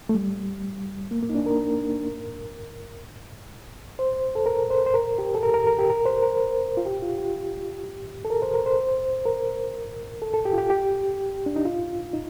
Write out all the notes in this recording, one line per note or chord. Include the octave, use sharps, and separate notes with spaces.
A3
G3
A#3
A#3
D#4
D4
A#4
C5
A4
A#4
C5
C5
A#4
G4
A4
A#4
A#4
A#4
G4
A#4
C5
A#4
F4
G4
F4
G4
A4
A#4
C5
A#4
C5
A#4
A4
A4
G4
F4
G4
G4
D4
D#4
F4
D#4